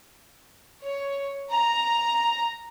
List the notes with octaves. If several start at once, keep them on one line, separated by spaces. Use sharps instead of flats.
C#5
A#5